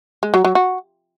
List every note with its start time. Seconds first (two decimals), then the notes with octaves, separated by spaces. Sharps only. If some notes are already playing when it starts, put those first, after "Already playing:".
0.23 G#3
0.34 F#3
0.45 F#3
0.55 F#4